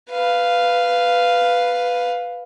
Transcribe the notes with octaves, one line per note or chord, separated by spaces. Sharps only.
B4 F5